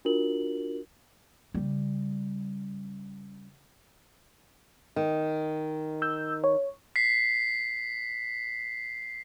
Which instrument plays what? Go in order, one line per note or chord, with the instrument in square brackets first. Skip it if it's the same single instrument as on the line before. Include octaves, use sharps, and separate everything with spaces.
[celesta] D4 F4 F#4 A#4 F#7
[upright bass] C#3 G3
[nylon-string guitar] D#3
[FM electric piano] E6 G6
C#5
[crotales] B6 C7